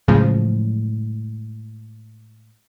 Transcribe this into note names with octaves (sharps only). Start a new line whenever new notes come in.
A2 C#3 F3 F#3 G#3